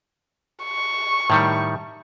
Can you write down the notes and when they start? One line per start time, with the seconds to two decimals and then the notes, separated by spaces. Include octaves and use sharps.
0.64 C#6
1.30 A2 D#3 G3